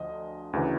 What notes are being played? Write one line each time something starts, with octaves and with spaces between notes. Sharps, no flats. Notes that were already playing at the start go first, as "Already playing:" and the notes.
Already playing: D2 D3 F3 D#5
D2 C#3 E3